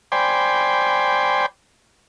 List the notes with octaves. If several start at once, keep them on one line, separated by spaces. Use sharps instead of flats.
C5 D5 G5 G#5 B5